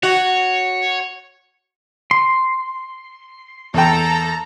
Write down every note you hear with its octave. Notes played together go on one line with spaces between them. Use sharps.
F#4 C#5
C6
E2 A4 G5 A#5